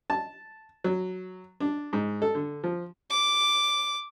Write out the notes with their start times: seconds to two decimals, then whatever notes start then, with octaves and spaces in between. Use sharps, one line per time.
0.10 A5
0.84 F#3
1.60 D4
1.93 G#2
2.22 A4
2.35 D3
2.64 F3
3.10 D6